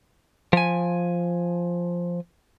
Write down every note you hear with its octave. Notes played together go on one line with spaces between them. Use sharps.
F3 G#5